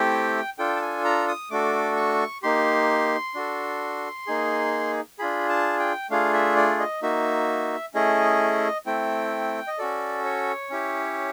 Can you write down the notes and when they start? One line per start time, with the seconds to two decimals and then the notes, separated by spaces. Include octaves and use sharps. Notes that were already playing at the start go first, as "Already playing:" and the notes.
Already playing: A3 C4 E4 G4 G5
0.58 D4 F4 A4 G5
0.76 A5
0.82 G#5
1.05 A#5
1.28 D#6
1.50 A3 D4 F#4 A4 D6
1.96 C#6
2.43 A#3 D#4 G4 C6
3.34 D4 F#4 A4
4.27 A#3 D#4 G#4
5.19 D4 F4 G#4 B5
5.49 A5
5.79 G5
6.10 A3 D4 F4 G#4 F5
6.34 E5
6.56 D5
6.80 D#5
7.02 A#3 D#4 F#4 E5
7.94 A3 C#4 E4 G#4 D#5
8.86 A3 C4 E4 G5
9.67 D#5
9.78 C#4 F#4 A4 D5
10.25 C#5
10.70 C#4 E4 G4